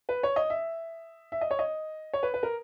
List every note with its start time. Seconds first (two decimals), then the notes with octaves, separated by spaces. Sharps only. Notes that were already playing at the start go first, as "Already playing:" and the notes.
0.09 B4
0.23 C#5
0.36 D#5
0.50 E5
1.32 E5
1.41 D#5
1.51 C#5
1.59 D#5
2.13 C#5
2.23 B4
2.34 B4
2.43 A#4